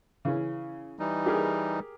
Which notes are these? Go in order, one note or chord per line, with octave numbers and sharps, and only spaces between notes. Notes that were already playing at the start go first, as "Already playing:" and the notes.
C#3 E3 C#4
E3 G3 D#4
G4 G#4 A#4